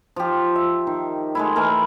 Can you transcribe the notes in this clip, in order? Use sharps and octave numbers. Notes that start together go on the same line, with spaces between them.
F3 G4
E5
D#3
G#3 A3 E4
E3 A3 A#4